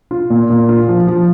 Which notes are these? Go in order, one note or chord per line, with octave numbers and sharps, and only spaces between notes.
F4
A#2
A#2
F4
F3
F3